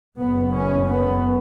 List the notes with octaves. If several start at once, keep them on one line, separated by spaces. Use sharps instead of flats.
F#1 F#2 C#3 B3
C#4
B3